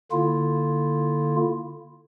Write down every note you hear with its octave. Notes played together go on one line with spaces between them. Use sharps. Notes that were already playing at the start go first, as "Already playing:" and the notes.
D3 A#3 E4 F4